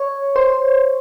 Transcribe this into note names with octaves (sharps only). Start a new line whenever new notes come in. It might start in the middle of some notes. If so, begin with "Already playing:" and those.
Already playing: C#5
C5